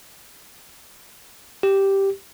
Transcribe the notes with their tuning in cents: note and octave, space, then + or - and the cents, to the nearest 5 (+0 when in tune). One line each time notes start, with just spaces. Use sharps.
G4 -5